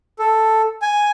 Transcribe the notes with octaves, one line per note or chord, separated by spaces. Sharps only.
A4
G#5